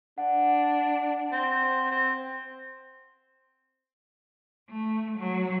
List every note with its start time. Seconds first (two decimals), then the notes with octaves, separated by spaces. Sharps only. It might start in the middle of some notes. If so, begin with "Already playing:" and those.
0.18 D4 F#5
1.32 C4
1.91 C4
4.69 A3
5.19 F#3